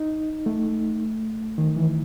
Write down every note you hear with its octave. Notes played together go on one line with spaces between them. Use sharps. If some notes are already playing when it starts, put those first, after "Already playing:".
Already playing: D#4
A3
D#3
E3